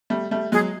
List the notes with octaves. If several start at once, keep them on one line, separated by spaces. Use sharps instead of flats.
G3 A3
G3 A3
F#3 G#3 G#4